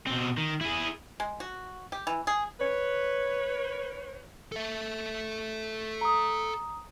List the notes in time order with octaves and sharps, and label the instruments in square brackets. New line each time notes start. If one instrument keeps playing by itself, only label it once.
[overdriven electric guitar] B2 C4
D#3
E4 G#4
[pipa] G#3
F#4
G4
E3
G#4
[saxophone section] B4 C#5
[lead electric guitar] A4 E5
[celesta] A#5 D#6